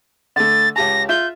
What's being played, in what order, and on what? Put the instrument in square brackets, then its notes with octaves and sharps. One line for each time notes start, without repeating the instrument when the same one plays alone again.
[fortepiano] D3 A3 [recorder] A6
[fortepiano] C#2 G4 A5 [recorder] A#6
[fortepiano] F4 E5 [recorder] G6